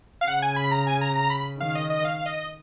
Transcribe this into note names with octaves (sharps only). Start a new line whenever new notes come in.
F5
C#3 F#5
G#5
B5
A#5
G#5
A#5
A#5
B5
D#3 F5
D#5
D#5
F5
D#5